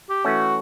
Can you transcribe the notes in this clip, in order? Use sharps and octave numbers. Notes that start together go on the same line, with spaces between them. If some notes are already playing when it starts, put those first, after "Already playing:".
G4
E3 A3 C#4 F#4